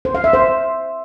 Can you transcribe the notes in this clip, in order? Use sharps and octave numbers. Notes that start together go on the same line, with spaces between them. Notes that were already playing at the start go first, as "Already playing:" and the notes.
C5
F5
E5
C5